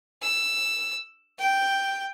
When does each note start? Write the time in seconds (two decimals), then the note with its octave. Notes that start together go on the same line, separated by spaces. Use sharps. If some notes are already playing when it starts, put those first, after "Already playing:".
0.22 E6
1.38 G5